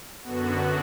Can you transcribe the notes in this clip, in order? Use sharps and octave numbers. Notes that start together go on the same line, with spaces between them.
F#2 D3 B3 F#4